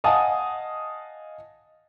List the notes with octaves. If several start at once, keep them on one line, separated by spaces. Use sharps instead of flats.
D#5 F5 F#5 G#5 A5 D#6